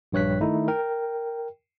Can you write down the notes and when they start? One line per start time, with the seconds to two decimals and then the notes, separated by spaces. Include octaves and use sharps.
0.12 A#1 G2 C#5 F#6 B6
0.40 D#3 A3 D#4 E4
0.68 A#4 G5